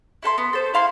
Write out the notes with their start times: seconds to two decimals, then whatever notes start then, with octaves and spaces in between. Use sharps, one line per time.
0.23 E4 A4 G#5 C6
0.38 B3
0.53 A4 C5
0.74 E4 F5 C6